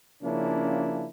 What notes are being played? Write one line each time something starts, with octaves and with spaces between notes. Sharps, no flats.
C#3 F3 A#3 C#4 D4 E4